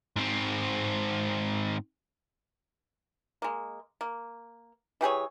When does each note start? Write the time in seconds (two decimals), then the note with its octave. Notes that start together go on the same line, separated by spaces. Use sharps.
0.16 G#2 C4
3.42 G#3 A#3
4.01 A#3
5.01 E3 G4 G#4 C#5